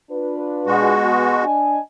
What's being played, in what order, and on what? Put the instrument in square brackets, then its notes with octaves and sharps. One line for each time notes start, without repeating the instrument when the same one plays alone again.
[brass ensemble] D4 F4 B4
[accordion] B2 G#3 F#4
[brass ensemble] D4 D#5 G#5